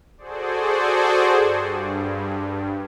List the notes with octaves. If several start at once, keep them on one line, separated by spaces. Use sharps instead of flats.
F#4 G#4 A4 C5 D5
G2